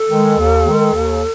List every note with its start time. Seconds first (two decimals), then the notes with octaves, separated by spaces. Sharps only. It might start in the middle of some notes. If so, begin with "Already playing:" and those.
Already playing: A4
0.10 D#3 G#3
0.38 D#2
0.66 D#3 G#3
0.93 D#2